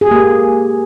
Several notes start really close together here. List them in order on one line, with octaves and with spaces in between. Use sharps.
G#4 G4 A#3